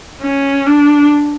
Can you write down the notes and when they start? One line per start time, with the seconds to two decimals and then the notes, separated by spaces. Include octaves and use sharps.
0.22 C#4
0.67 D4